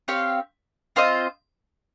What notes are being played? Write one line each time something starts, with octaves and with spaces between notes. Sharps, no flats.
C4 G4 C#5 F5
C4 F4 C5 D#5